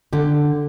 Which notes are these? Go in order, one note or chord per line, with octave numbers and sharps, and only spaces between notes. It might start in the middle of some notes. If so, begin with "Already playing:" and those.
D3 G4